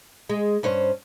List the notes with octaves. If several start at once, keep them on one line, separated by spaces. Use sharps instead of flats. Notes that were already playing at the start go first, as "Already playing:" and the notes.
G#3
G2 C#4 C5